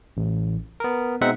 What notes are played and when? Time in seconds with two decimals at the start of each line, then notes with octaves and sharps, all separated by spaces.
0.17 A1
0.80 B3 A#4
1.21 B2 G#3 C4 D#4 E5 F#5